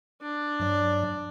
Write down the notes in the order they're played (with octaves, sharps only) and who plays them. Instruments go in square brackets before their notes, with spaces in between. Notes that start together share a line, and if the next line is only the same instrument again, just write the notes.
[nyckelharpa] D4
[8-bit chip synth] G2 F#3 D5